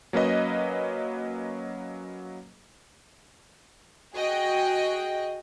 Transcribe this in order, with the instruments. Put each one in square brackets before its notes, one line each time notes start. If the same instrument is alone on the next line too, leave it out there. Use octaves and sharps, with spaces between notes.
[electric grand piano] F#3 A#3 C#4 B4 D#5
[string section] F#4 G#4 D#5 G5